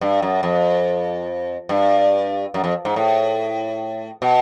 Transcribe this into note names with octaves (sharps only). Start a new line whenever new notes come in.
G2
F#2
F2
G2
F#2
F2
G#2
A2
B2